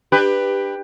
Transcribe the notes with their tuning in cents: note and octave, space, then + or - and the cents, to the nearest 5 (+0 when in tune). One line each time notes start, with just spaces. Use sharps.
D4 +25 G4 +15 B4 +5